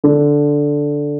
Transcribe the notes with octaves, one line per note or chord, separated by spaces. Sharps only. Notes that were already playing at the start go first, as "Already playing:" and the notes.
D3